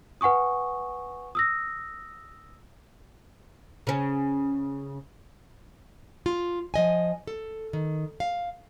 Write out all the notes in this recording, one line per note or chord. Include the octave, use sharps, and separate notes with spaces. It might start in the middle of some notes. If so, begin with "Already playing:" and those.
B4 F#5 G#5 C#6 D#6
D#6 E6 A#6
C#3 C#4
F4
F3 D#5 G#5
A4
D#3
F5